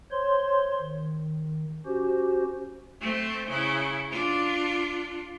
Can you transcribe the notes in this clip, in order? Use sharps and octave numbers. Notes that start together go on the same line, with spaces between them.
C5 C#5 C6
D#3
C#4 F#4 G4 C5
A3 C4
C#3 E4
D4 F4